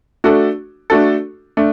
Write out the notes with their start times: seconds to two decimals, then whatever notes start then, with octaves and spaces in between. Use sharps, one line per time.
0.24 A3 D4 F#4 A4
0.90 A3 D4 F#4 A4
1.57 A3 D4